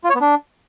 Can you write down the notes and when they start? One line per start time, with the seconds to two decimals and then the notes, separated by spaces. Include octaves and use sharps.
0.04 F4
0.10 C#5
0.15 B3
0.21 D4